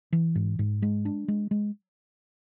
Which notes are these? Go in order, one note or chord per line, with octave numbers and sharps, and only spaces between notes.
E3
G#2
G#2
G#3
D4
G#3
G#3